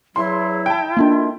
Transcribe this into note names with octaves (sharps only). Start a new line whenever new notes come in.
E2 C#3 F#3 E4 C6
G5 A5
D#3 A3 A#3 C#4 D4 F4